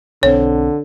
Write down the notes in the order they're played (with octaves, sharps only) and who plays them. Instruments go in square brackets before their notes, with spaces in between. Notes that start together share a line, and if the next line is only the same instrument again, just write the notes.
[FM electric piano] B1 C4 [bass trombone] D3 [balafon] C#5